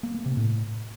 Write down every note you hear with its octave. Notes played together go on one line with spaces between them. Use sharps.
A#3
A#3
C3
A2